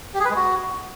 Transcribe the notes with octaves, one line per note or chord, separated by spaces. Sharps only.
G4
G#4
B4
G#3
F#4